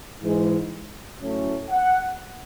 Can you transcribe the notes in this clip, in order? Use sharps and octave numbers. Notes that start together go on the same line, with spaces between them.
G#2 E3 G#3
A2 F#3 A3 C#4
F#5